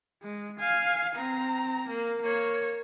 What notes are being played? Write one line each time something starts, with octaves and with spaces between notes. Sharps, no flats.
G#3
F5 G#5
C4 A#5
A#3
A#3 C#5